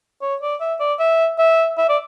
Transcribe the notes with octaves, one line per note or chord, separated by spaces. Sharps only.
C#5
D5
E5
D5
E5
E5
E5
D5